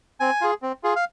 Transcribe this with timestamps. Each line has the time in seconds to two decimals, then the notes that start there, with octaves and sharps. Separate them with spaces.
0.20 C4 G#5
0.41 F4 G#4
0.62 C4
0.83 F4 G#4
0.96 F5